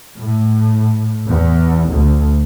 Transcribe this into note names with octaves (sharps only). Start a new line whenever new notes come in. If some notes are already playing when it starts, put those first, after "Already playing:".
A2
E2
D2